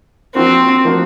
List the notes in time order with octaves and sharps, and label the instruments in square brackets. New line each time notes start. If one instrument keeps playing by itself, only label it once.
[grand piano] F3 A#3 D4 F#4 A#4 [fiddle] C4
[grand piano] F3 A#3 D4 F#4 A#4